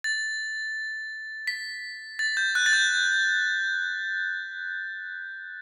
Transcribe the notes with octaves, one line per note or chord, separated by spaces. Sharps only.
A6
B6
A6
G6
F#6
A6
G6